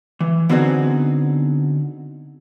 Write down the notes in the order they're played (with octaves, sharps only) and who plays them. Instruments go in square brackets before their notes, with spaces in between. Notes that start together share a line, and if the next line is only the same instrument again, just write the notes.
[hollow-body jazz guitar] E3
D3 B3 C4 D#4 F#4 G#4